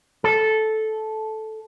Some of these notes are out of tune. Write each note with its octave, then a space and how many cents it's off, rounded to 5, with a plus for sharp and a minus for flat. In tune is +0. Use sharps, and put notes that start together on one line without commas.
A4 -10